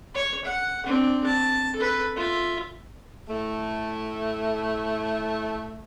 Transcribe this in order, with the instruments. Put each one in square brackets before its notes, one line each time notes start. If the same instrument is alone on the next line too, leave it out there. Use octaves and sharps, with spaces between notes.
[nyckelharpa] C#5
F#5
C4 D4
A5
A4 B4
F4 E5
[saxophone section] A2 A3